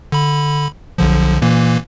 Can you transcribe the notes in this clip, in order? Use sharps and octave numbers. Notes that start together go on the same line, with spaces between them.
D3 B5
B1 D3 F3
A#2 E3 A#3